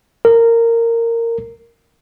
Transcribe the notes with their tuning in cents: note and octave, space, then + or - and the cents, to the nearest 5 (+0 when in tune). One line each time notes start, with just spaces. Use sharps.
A#4 -15